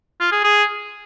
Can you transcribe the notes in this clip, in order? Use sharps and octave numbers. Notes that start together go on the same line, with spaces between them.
F4
G#4
G#4